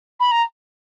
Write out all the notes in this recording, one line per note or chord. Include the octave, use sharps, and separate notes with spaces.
B5
A#5